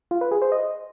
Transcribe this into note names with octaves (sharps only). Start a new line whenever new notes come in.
F4
B4
G#4
C5
D#5